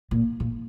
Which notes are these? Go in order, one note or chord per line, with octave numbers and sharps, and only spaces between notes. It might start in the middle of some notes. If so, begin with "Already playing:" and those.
A#2
A#2